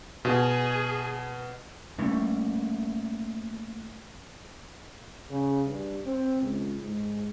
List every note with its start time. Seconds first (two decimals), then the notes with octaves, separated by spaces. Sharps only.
0.25 B2 G#4
1.98 G3 A3 A#3 C#4
5.30 C#3
5.66 G2
6.06 C4
6.42 C#2
6.82 G#2